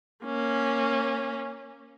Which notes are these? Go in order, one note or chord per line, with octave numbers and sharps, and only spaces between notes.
A#3 C#4